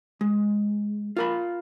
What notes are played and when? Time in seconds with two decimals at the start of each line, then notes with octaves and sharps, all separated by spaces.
0.21 G#3
1.17 F4 A#4 B5